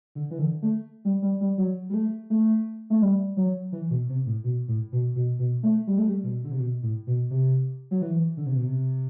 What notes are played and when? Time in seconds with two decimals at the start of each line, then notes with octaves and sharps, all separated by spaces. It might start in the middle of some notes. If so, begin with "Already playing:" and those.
0.15 D3
0.31 E3
0.39 D3
0.62 A3
1.05 G3
1.22 G3
1.41 G3
1.58 F#3
1.90 G3
1.94 A3
2.30 A3
2.90 A3
3.02 G3
3.37 F#3
3.72 E3
3.90 B2
4.09 C3
4.26 A2
4.44 B2
4.68 A2
4.92 B2
5.16 B2
5.39 B2
5.63 A3
5.87 G3
5.98 A3
6.07 G3
6.23 B2
6.44 D3
6.51 C3
6.59 B2
6.83 A2
7.07 B2
7.30 C3
7.91 F#3
8.02 E3
8.37 D3
8.46 C3
8.56 B2
8.65 C3